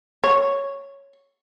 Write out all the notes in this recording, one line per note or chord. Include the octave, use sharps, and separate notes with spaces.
C#5